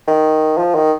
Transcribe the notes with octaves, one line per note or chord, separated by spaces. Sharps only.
D#3
F3
D#3